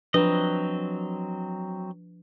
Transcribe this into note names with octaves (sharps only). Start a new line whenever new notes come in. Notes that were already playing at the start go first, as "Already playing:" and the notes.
F3 F#3 C4 D4 B4 D#5